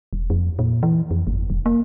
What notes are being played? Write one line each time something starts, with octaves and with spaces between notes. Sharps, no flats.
E1
F2
A#2
E3
F2
G1
E1
A#3